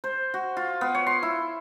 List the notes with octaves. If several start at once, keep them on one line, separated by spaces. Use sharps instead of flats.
C5
F#4
F4
B3
C#5
C6
E4